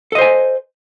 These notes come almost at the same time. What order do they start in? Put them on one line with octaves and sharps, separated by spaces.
A4 D#5 C5 G#5